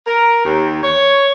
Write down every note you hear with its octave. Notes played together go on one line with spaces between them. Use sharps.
A#4
D#2
C#5